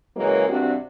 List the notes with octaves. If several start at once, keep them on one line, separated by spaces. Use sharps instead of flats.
C#3 E3 F#3 G#3 A#3
G2 C3 C4 D4 F#4